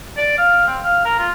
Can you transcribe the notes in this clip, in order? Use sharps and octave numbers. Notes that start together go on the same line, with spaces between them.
D5
F5
C4
F5
A#4
F4